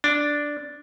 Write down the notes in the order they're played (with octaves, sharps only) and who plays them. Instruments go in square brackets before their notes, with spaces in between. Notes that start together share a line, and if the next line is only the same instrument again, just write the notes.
[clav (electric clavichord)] D4